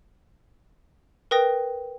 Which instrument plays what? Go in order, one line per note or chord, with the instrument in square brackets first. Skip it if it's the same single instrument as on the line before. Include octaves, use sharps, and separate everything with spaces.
[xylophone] A#4 B4 G5 D#6 A#6